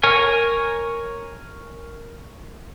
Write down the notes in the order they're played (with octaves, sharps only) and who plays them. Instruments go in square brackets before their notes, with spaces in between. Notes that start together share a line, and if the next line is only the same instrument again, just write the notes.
[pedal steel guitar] A#4 C#5 G#5